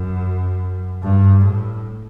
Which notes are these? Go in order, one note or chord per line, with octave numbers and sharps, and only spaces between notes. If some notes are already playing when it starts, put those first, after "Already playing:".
Already playing: F#2
G2
A2